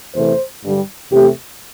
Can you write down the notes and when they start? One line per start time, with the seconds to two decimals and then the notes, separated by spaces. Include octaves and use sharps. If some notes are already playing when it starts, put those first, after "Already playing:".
0.14 E2 C3 E3 A3 C5
0.63 G2 D3 G3
1.11 E2 C3 A3 G4